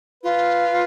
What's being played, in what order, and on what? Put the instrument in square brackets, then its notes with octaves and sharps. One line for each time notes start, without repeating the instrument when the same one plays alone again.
[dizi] F4 [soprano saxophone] B4